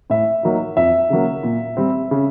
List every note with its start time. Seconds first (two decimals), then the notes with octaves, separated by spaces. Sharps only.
0.10 A2 E5
0.43 F#3 A#3 D#4
0.77 F2 E5
1.10 C#3 F#3 A#3
1.43 A#2
1.77 G3 C4
2.11 C#3